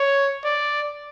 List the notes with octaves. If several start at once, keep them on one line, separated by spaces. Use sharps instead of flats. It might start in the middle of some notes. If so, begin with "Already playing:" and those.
Already playing: C#5
D5